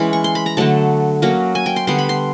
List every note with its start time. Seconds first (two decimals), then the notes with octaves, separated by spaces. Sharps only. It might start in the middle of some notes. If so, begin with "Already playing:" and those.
Already playing: E3 G#3 B3 C#4 B5
0.13 C#6
0.24 C6
0.35 B5
0.46 A#5
0.57 D3 F#3 A3 A5
1.22 F#3 A#3 C#4
1.55 G#5
1.66 G5
1.76 C6
1.87 D3 G3 B3 C6
1.98 B5
2.09 C6